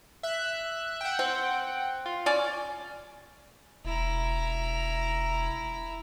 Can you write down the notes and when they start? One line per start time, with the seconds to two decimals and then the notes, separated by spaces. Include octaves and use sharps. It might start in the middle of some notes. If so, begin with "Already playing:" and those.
0.23 E5 F#6
1.01 F#5 G5
1.19 C4
2.06 F4
2.26 C#4 D5
3.85 E1 E4 A#5